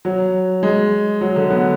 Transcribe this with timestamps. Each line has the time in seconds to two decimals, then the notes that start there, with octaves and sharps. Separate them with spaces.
0.05 F#3
0.63 G#3
1.21 F#3
1.36 D3
1.50 B3